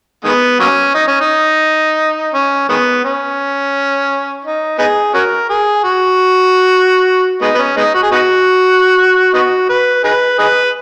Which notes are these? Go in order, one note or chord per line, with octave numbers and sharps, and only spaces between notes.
D#3 G#3 B3
F#3 A#3 C#4
D#4
C#4
D#4
C#4
D#3 G#3 B3
C#4
D#4
B3 D#4 G#4
C#4 F#4 A#4
G#4
F#4
G#3 B3 D#4
B3
C#4
G#3 B3 D#4
F#4
G#4
B3 D#4 F#4
B3 D#4 F#4
B4
D#4 G#4 B4
D#4 G#4 B4